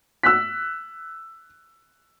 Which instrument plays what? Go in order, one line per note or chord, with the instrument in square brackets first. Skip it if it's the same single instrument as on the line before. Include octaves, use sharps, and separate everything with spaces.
[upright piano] E6 F#6 B6